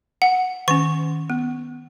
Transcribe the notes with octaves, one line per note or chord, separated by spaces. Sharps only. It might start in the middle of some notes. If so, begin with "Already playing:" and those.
F#5
D#3 C#4 C#6
B3